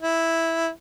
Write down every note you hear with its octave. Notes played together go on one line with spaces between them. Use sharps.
E4